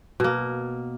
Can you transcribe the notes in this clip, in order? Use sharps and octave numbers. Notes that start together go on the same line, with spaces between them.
B2 A#3